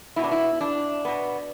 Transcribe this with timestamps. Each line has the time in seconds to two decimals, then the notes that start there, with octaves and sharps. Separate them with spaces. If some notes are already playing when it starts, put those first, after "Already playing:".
0.16 B2 B3 E4
0.24 D4
0.32 E4
0.61 D4
1.05 B2 B3